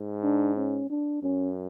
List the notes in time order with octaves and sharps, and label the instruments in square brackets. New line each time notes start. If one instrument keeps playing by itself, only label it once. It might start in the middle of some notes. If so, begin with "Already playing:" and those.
Already playing: [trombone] G#2
[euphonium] D4
C#4
D4
[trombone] F#2 [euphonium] C#4